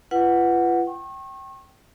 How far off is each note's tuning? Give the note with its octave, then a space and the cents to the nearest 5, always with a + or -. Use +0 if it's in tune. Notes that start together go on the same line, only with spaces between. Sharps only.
F4 -35 B4 +0 F#5 +0
G5 -20 C#6 -35